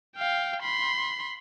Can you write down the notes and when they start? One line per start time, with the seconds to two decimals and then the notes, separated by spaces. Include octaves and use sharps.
0.17 F5 G5
0.63 B5 C6